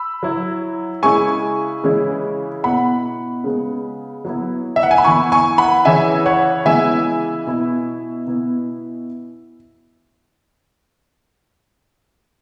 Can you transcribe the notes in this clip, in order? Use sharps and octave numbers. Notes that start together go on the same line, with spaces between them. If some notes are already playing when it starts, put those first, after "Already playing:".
Already playing: B5 E6
F#3 E4
C#3 G#3 E4 G#5 C#6
C#3 E3 G#3 C#4 E4
B2 B3 E4 F#5 B5
C#3 G#3 B3
F#3 B3 E4
E5
F#5
G#5
B5
E3 B3 E4 G#5 C#6
G#5 C#6
F#5 B5
C#3 E3 C#4 E4 E5 G#5
C#5 F#5
C#3 E3 G#3 B3 E4 E5 G#5
B2 B3 E4
B2 B3 E4